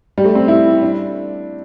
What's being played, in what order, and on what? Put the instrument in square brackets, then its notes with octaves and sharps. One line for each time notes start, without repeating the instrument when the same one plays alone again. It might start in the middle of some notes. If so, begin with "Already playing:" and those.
[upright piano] G3
A3
C4
E4
D4